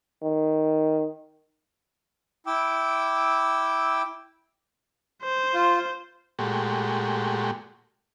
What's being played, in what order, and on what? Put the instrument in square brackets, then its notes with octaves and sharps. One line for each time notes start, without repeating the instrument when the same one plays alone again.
[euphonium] D#3
[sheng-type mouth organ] E4 G5 D6 E6
[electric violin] C5
[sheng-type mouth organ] F4
[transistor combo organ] A#2 G#3 A3 F#4 G4